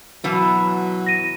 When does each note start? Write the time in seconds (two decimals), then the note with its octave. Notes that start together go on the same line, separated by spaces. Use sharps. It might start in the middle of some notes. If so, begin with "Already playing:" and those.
0.24 B2 E3 F#3
1.06 A#6 D#7